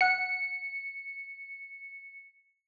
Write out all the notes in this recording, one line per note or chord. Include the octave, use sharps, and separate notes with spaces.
F#5 F#6 C#7